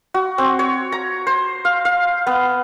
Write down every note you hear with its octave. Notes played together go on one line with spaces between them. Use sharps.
F#4
C4
C#5
A#5
C5
F5
F5
B3